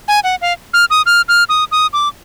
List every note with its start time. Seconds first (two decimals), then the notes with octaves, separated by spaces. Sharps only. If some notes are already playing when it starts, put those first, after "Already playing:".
0.08 G#5
0.24 F#5
0.41 F5
0.74 F6
0.90 D#6
1.06 F6
1.28 F6
1.49 D#6
1.72 D#6
1.93 D6